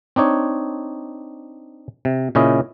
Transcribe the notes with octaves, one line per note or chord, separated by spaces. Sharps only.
C4 D4 D#4 C#5
C3
A#2 C#3 C#4 E4 D#5